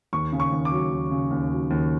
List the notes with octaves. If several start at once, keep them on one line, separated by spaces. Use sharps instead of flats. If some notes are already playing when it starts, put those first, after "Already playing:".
D#2 C#6
C#3
C#6
D#2
D6
F#3
D#2
C#3
D#2
F#3
D#2